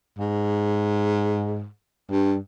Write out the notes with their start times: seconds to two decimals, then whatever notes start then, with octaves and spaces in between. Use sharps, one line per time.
0.19 G#2
2.12 G2